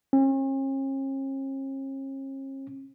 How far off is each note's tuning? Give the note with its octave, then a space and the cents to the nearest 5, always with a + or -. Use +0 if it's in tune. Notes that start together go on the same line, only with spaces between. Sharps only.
C#4 -45